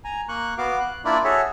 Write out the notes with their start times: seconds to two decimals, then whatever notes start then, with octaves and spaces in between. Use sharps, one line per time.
0.05 G#5 A#5
0.29 A#3 C#6 F#6
0.58 B3 F#4 F5 D6
0.80 F#6
1.05 A#3 D4 E4 F4 D5
1.24 F#4 G#4 A4 C#5 E5